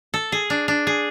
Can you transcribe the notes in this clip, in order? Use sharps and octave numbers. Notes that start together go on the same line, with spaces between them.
A4
G#4
D4
D4
G#4